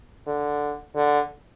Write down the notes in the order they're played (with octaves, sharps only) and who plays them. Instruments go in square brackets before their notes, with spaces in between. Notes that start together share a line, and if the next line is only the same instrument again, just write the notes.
[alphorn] D3
D3